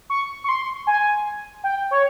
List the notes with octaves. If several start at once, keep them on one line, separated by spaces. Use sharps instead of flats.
C#6
C#6
C6
G#5
G5
C#5